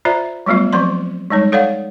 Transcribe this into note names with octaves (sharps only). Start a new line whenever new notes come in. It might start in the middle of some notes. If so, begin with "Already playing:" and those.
F4 C5 D5 E5 A#5
F#3 G3 A3 B3 F4
F3 F#3 C4 D5 C6
G3 G#3 D#4 C#5
A4 C#5 D5 F5 F#5